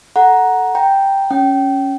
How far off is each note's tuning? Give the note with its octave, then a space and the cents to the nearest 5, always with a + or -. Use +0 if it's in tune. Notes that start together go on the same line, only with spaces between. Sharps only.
A4 +0 F#5 +0 A#5 +10
G5 +0 A#5 +0
C#4 +0 G5 -20